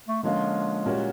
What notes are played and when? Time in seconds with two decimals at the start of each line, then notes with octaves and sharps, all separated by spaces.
0.08 A3
0.23 D3 F3 G#3 A#3 C#4 F4
0.86 A#2 G3 A#3 C#4 F#4